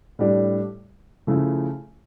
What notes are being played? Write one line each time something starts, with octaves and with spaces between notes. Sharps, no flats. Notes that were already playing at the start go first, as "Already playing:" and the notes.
A2 G3 D4 G4
C#3 F3 A3 E4